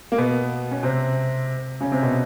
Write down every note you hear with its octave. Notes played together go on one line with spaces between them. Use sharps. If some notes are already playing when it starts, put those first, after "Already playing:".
A#3
B2 B3
C#4
C3 C4
C#3 C#4
C3 C4
B2 B3